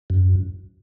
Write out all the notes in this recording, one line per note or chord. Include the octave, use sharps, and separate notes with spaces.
F#2